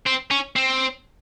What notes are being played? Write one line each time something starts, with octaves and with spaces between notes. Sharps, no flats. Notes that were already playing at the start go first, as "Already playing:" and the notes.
C4
C#4
C4